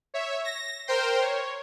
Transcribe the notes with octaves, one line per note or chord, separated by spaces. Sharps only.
C#5 E5
A#6
A#4 C5 G5 C6
C#5